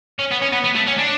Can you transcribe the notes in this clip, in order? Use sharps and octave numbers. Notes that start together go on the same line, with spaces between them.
C#4
B3
C#4
B3
B3
A3
C#4
D4